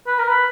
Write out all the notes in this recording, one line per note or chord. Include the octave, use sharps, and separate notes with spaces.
B4
A#4
B4